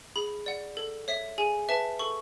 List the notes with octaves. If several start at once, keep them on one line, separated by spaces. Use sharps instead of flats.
G#4 B5
D5 F#5
A4
C#5 E5
G#4 G#5
B4 E5 A5
A4 C#6